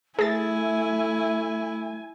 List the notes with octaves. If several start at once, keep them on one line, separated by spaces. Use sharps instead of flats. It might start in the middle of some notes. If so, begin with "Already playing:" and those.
A3 E4 G#4 G#5 A6